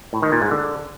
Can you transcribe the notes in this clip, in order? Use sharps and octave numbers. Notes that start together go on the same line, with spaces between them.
A2
D#3
A#2
G#2
D3